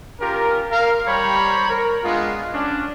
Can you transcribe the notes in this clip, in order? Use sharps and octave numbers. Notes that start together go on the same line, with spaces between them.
C#4 F4 G4 A#4
A#4 F5
G3 G4 C5 C#5 A#5 B5
A#4
G#3 B3 D4 F4
C#4 D4